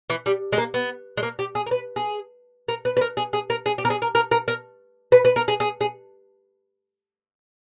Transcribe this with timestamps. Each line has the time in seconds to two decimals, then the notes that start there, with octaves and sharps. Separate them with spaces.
0.10 E3
0.26 G3
0.53 G#3
0.58 A#3
0.74 B3
1.17 G#3
1.23 A#3
1.39 G4
1.55 G#4
1.66 A#4
1.71 B4
1.96 G#4
2.68 A#4
2.85 B4
2.97 B4
3.01 A#4
3.17 G#4
3.33 G#4
3.50 A#4
3.66 G#4
3.78 G4
3.85 A#4
3.90 G#4
4.02 A#4
4.15 A#4
4.31 A#4
4.48 A#4
5.12 B4
5.25 B4
5.36 A#4
5.48 G#4
5.60 G#4
5.81 G#4